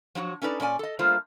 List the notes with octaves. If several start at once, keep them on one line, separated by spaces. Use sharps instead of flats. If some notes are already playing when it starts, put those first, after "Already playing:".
F3 F#3 F4 F#4
C#4 D#4 A4 B4 D5
A#2 C#4 D5 G#5
A4 D#5
G3 A3 A#3 F4 C5